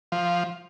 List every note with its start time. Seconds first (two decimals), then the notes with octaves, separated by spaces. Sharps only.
0.12 F3